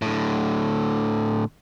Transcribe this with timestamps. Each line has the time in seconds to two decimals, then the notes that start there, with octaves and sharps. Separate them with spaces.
0.02 A2 D3